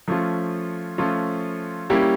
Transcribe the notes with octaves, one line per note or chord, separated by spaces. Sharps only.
F3 A3 C#4 F4
F3 A3 C#4 F4
G3 A#3 C#4 E4 G4